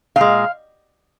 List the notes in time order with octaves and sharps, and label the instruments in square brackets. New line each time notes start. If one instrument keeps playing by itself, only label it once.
[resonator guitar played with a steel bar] A#2 G#3 F5